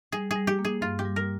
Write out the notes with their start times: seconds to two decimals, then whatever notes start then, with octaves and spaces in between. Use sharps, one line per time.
0.12 G3 G#4
0.31 G3 G#4
0.47 G4
0.59 A#3
0.65 G#4
0.81 G2 F4
0.99 G4
1.05 G3
1.16 A#4